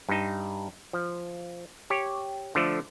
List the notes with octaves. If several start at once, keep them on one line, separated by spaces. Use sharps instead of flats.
G2 D#4
F3
G4 C#5
D3 F3 A3